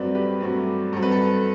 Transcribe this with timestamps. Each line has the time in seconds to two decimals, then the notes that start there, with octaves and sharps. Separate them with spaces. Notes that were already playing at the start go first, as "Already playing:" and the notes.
Already playing: G2 F#3 A3 C4 B4 D5
0.15 G4 B4
0.41 G2 F#3 A3 C4
0.93 G2 F#3 C4 A4
1.03 B4
1.12 A4